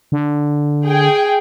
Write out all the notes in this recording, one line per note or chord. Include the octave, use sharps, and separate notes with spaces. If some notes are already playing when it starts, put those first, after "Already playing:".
D3
G#4 G5